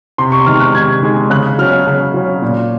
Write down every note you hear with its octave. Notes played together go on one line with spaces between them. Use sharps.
C3 C6
C#6
D#3 G#3 F6
F#6
C3 G#6
D#3 G#3
C#3 F#6
F#3 C#4 F6
C#3
F#3 C#4
A#2